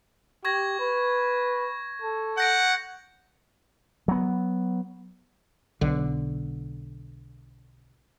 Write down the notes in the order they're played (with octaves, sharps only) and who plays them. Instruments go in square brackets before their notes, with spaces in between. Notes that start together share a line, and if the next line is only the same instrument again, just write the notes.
[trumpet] G4 [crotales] C#6 G#6 A#6
[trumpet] B4
A4
[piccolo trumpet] F#5 [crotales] G6 A#6 D7
[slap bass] F#3 B3
[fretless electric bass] B1 D3